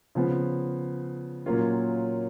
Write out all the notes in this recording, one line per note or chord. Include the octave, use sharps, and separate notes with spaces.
C#3 F3 B3
A#2 F#3 A#3 C#4 F4